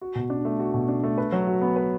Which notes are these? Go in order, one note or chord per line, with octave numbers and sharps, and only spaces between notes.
F#4
B2
D4
A3
F#4
B2
D4
A3
B4
F#3
F#4
B3
B4